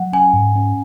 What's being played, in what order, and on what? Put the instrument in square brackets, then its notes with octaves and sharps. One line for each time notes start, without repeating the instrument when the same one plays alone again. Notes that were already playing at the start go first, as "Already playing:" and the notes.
Already playing: [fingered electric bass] F#3 [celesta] F#5
[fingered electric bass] C#4 [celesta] G#5
[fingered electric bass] G#2
C#4